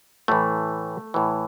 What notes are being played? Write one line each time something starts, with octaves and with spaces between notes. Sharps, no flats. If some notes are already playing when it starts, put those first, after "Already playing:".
A2 E3 A3
A2 E3